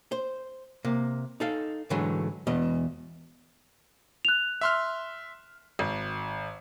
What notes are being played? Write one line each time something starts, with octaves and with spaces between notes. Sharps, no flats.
C5
C3 A#3
D#4 A4 F5
G#2 D3 E3 F#3 G#3 A3
E2 B2 D#5
F#6 F7
E5 C6 F6
G#1